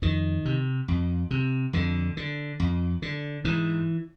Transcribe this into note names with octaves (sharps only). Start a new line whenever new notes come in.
F2 D#3
C3
F2
C3
F2 D3
D3
F2
D3
G#2 E3